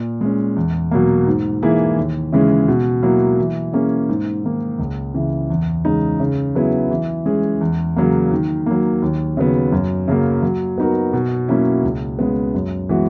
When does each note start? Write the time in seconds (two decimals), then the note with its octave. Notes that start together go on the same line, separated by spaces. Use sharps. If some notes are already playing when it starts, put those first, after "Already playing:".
Already playing: A#2
0.21 G#3 C#4
0.56 E2
0.91 B2 F#3 A#3
1.27 G#2
1.62 E3 A#3 E4 G#4
1.97 D#2
2.33 C#3 E3 G#3 C#4
2.68 B2
3.03 F#3 A#3 E4
3.38 E3
3.73 A#3 C#4 G#4
4.09 G#2
4.44 D#3 A#3
4.79 C#2
5.14 C#3 E3
5.50 E2
5.85 C#3 G#3 D#4
6.20 C#3
6.55 F#3 B3 E4 G#4
6.91 E3
7.26 G#3 C#4 G#4
7.61 E2
7.96 C#3 F#3 A#3
8.32 D#3
8.66 F#3 A#3
9.02 D#2
9.37 C#3 F#3 B3
9.72 F#2
10.08 C#3 F#3 A#3
10.43 F#3
10.78 B3 D#4 F#4 A#4
11.13 B2
11.48 F#3 A#3 C#4 E4
11.83 C#2
12.19 C#3 G#3 B3
12.54 F#2
12.89 E3 G#3 B3 F#4